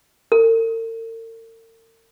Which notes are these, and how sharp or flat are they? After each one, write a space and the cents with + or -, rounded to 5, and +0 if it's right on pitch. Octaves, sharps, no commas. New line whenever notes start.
A#4 -45